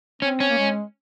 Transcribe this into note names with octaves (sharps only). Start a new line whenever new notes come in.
C4 C#4
C#4
A#3
G#3